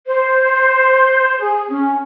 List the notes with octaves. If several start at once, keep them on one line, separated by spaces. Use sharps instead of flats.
C5
G#4
C#4